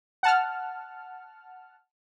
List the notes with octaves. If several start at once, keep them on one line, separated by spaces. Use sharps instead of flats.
F#5 A5 F6